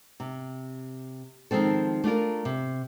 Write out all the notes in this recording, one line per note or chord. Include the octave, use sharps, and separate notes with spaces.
C3
D#3 F3 G#3 C4 A4
A3 D4 F4 A#4
C3